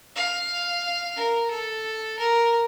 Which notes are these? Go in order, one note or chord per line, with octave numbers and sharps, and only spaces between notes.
F5
A#4
A4
A#4